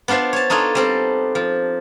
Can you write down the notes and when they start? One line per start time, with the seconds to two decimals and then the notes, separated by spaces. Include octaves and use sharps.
0.08 B3 D4 F4 C5 E5
0.33 C#5 A5
0.50 D4 D#4 F4 A4 C#5
0.75 G3 C4 A4
1.35 F3